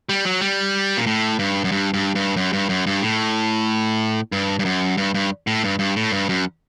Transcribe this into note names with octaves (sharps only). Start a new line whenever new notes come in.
G3
F#3
G3
A#2
A2
G2
F#2
G2
G2
G2
F#2
G2
F#2
G2
A2
G2
G2
F#2
G2
G2
A2
G2
G2
A2
G2
F#2